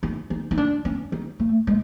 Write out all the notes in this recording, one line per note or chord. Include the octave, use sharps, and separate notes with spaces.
E4
D#4
D#4
D4
C#4
D#4
A3
G#3